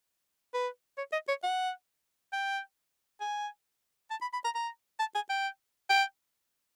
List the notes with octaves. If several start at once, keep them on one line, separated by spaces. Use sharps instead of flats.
B4
C#5
D#5
C#5
F#5
G5
G#5
A5
B5
B5
A#5
A#5
A5
G#5
G5
G5